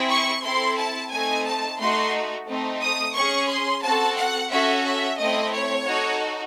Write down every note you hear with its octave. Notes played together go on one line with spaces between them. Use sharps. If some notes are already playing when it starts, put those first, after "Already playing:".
Already playing: C4 E4 G#4
C#6
C4 E4 A4 C6
A5
A3 C4 D#4 G#5
A5
A3 D#4 F#4 C6
A3 C4 D#4
D#6
C#4 G#4 C#6
C6
C4 F#4 A4 A5
F#5
C#4 F#4 A4 E5
E5
A3 C4 E4 D#5
C#5
D#4 F#4 A4